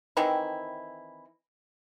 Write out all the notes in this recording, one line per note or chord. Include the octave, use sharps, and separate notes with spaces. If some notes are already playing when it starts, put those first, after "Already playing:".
D#3 E3 C4 E4